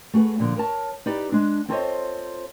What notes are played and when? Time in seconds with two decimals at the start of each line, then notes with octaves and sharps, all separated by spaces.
0.14 A3 F#4 G#4 B4
0.39 A#2 D3 F3
0.56 A#4 C#5 A5
1.06 D#4 E4 G4 B4 D5
1.32 G#3 D4
1.68 C4 F4 A4 C5 C#5 D#5